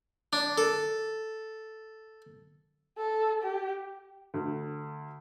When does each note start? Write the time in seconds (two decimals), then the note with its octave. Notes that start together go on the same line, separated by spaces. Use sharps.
0.33 D4
0.58 A4
2.98 A4
3.43 G4
4.34 D2